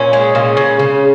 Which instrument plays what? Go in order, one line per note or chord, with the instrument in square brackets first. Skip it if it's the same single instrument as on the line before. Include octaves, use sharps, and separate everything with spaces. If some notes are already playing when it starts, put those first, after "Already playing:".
Already playing: [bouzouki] A#2 C#4
G#3
A#2
C#3
C#3